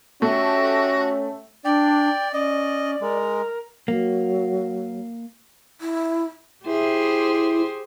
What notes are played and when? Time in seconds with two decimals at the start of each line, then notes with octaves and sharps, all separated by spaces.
0.22 A3 C#4 F#4 G4 E5
1.65 D4 D5 G5
2.33 C#4 D5 D#5
3.01 G#3 A#4
3.88 F#3 A#3
5.81 E4
6.65 E4 G4 G#4 C5